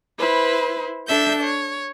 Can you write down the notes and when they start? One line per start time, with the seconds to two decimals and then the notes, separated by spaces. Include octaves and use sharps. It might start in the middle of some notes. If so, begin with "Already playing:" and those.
0.18 E4 B4 C5
1.08 D4 A4 E5 G6
1.44 C#5